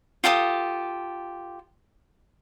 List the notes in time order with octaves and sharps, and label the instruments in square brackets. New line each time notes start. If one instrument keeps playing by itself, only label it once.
[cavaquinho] F4 G4 A4 D#6